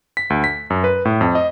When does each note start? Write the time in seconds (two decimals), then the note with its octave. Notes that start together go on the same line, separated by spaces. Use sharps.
0.17 B6
0.30 D2
0.44 B6
0.70 F#2
0.84 B4
1.05 A2
1.21 F2
1.35 D#5